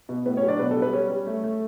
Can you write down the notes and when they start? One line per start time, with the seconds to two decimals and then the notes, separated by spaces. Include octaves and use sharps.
0.09 B2
0.26 A2 B3 B4
0.37 C#4 C#5
0.43 F#3
0.48 D4 D5
0.59 B2 B3 B4
0.71 A4
0.77 G3
0.82 B3 B4
0.93 G3 C#4 C#5
1.10 G3
1.27 A3
1.44 A3